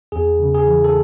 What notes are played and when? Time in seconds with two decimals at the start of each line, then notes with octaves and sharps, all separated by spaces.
0.12 E2 G#4
0.39 C#3
0.54 G#4
0.67 E3
0.84 A4